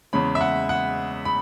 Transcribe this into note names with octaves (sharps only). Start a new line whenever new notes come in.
E2 C#3 G#3 C#4 B5
E5
F#5
F#5
B5